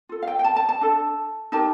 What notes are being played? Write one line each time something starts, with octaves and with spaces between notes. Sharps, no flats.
F4 A4
F5
G5
G5
A5
A5
A5
D4 A4
D#4 G4 A#4 A5